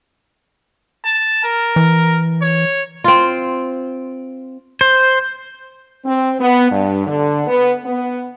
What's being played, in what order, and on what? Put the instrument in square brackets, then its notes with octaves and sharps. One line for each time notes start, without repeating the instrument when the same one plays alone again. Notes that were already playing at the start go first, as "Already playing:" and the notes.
[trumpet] A5
A#4
[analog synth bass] E3
[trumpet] C#5
[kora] C4 F4
[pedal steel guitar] C5
[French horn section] C4
B3
G2
D3
B3
B3